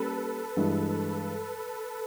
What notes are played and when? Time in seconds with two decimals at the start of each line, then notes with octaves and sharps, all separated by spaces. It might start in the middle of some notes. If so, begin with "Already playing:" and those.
Already playing: G3 A#3 C#4 A4 B4
0.57 G2 E3 G#3